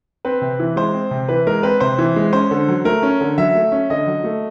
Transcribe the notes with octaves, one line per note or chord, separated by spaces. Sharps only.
C4 B4
C3
E3
G#3 C5
C4
C3
E3 B4
G#3 A#4
C4 B4
C3 C5
E3
G#3
C#4 C5
D3
F#3
A3 A#4
C#4
D3
F#3 E5
A3
C#4
D3 D#5
F#3
A3